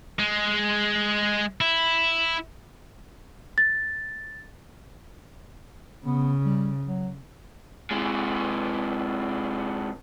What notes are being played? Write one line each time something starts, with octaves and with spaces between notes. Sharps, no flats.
G#3
E4
A6
C#3 B3
G3
F#3
C3 G#3